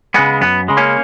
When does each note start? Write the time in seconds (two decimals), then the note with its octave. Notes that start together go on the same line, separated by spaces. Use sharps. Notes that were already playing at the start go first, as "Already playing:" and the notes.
0.14 C#3 G#3 B3
0.41 F#2 B3
0.68 C#3 G#3
0.77 A#3 C#4